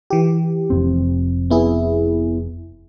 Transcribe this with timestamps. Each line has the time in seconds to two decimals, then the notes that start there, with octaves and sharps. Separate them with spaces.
0.10 E3 G4
0.70 F1 F2 C4
1.50 B3 E4 G#4